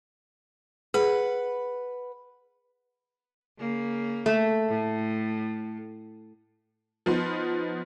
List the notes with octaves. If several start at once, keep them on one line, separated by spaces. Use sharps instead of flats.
G#4 B4 F#5
C#3 A#3
A3
A2
F3 B3 D#4 C6